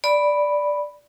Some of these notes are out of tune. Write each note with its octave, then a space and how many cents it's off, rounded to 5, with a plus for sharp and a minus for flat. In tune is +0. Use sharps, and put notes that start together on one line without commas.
D5 +0 B5 +0